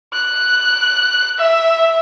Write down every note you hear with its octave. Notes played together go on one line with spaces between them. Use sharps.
F#6
E5